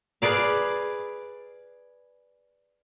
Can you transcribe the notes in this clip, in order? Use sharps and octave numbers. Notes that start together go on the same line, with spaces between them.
G#4 B4 D5 F5